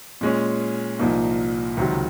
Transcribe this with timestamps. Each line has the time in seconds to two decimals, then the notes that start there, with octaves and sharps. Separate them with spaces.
0.21 A#2 G#3 C#4
0.99 C2 A#2 F3 A#3 D#4
1.77 C#2 C3 D#3 F#3